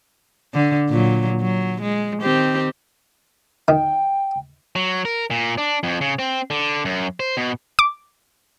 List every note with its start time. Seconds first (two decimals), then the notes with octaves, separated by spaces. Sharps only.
0.54 D3
0.89 A#2 F#3
1.41 F#3
1.81 G#3
2.22 D#3 C4 G4
3.68 D#3 G5
4.76 F#3
5.05 A#4
5.31 A#2
5.58 D4
5.83 F2
6.01 C#3
6.19 C4
6.50 D3
6.85 F#2
7.20 C5
7.37 B2
7.79 D6